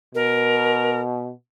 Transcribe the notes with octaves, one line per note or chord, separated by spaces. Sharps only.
B2 A#4